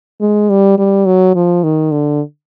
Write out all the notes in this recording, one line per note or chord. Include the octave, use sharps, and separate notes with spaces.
G#3
G3
G3
F#3
F3
D#3
D3